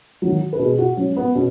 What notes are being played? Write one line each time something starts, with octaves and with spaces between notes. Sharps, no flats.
D#3 F#3
B4
B2 G#4
F#4
F#3 C#4
B3
B2 C#4